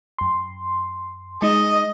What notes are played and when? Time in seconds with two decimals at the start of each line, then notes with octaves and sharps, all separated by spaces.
0.19 F#2 C6
1.42 G#3 D#4 D#5